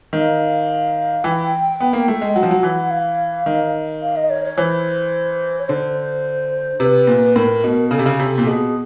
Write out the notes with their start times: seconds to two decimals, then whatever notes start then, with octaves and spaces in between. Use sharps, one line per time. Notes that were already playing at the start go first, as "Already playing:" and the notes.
0.13 D#3 F5
1.24 E3 G5
1.80 B3
1.93 A#3
2.08 A3
2.21 G#3
2.35 F#3 F#5
2.43 F3
2.51 F#3
2.63 E3
2.90 F5
3.46 D#3
4.02 F5
4.16 D#5
4.30 C#5
4.44 C#5
4.58 E3 C5
5.60 C#5
5.69 D3 C5
6.80 C3 B4
7.07 A#2
7.36 A2 A#4
7.64 B2
7.91 C#3 A4
7.99 C3
8.06 C#3
8.19 C3
8.38 A#2
8.47 B2 G#4